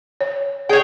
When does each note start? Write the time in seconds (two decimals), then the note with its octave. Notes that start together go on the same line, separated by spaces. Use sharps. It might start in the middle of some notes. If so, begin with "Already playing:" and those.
0.21 C#5
0.69 G#4 C#5 G5